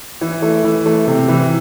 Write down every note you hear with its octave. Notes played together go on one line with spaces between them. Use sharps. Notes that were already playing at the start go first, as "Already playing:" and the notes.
E3
A3
E3
A3
C3
E3